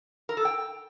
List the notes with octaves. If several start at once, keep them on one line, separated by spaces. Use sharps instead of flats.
A#4
A4
G5